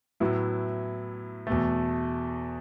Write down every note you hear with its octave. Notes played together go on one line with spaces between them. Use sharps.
A2 F#3 B3 E4
E2 B2 A3